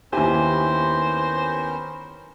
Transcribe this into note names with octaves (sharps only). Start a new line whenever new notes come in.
D#2 B3 C#4 E4 G4 A#4 C5 G#5